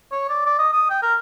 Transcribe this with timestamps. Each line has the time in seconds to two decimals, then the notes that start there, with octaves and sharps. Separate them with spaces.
0.12 C#5
0.30 D5
0.46 D5
0.59 D#5
0.73 D#6
0.90 G5
1.03 A#4